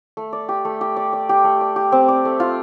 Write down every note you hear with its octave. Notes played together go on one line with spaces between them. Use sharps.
A3
D5
G4
A3
G4
D5
D5
G4
A3
D5
G4
C4
D5
A3
F4